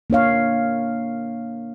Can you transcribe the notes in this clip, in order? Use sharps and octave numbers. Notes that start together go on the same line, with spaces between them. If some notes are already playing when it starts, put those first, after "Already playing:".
A#3 D4 C#5 F5